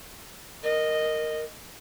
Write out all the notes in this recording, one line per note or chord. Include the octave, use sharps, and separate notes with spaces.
A#4 D#5